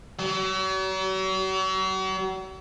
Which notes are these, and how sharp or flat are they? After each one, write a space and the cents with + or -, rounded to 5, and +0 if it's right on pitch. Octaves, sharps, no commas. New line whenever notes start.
F#3 +40